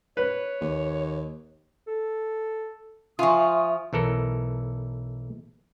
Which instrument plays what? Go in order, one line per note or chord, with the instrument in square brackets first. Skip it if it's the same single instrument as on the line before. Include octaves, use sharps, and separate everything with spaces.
[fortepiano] B4 [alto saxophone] C#5
[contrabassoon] D#2
[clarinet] A4
[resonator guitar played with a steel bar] F3 F4 [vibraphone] E5 C#6 [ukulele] G#5 [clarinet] D#6
[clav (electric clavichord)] B1 E3 A4 A#4